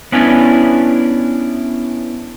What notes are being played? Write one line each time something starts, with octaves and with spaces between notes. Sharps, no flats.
B3 C#4 D4 E4 G#5